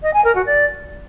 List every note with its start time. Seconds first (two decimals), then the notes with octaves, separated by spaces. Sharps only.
0.02 D#5
0.13 G#5
0.24 A#4
0.35 F#4
0.46 D5